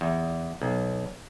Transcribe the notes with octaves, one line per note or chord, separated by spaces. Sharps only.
E2
B1